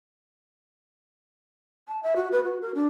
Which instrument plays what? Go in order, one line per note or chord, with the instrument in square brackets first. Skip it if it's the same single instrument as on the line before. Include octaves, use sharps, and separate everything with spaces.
[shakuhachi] A5
E5
F#4
B4
F#4
A#4
D4